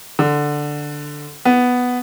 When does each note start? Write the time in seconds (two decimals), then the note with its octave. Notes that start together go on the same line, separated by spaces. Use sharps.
0.19 D3
1.45 B3